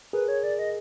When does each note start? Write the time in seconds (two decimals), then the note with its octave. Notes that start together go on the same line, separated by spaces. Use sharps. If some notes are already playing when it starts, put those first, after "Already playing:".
0.13 G#4 A#4 B4
0.28 C#5
0.43 D5
0.59 D#5